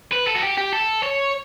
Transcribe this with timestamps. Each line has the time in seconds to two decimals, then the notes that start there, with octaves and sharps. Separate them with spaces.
0.13 B4
0.28 A4
0.35 F#4
0.43 G4
0.58 G4
0.73 A4
1.03 C#5